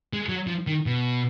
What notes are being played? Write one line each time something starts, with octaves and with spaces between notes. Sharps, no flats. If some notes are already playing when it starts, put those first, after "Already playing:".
G#3
F#3
F3
D#3
B2